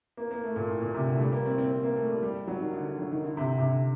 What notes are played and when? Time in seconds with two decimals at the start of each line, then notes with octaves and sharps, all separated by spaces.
0.17 A#3
0.31 A#3
0.44 A3
0.56 A#2
0.69 A2
0.82 A#2
0.94 C3
1.07 D3
1.15 A3
1.20 G3
1.32 A#3
1.45 C4
1.58 C4
1.71 C4
1.84 A#3
1.96 A3
2.09 G3
2.22 G3
2.47 F#3
2.60 D#3
2.73 D3
2.86 D3
2.99 F#3
3.11 D#3
3.24 D3
3.37 C3
3.50 D3
3.58 C3
3.63 D3